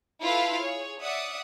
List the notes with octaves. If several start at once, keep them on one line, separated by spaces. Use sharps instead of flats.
E4 F4 A4 B4 F5
G#4 C#5
D5 E5 F#5 D#6